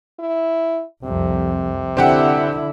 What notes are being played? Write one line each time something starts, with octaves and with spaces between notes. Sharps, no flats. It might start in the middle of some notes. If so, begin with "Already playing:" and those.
E4
C2 F2 C3
D3 C4 E4 G4 F#5